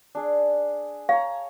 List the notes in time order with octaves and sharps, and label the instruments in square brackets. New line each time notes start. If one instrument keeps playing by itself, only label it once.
[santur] D4 G#4
[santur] C#5 A#5 [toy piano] F5